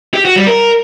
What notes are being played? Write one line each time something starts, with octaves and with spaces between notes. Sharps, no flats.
G4
F#4
G3
A#4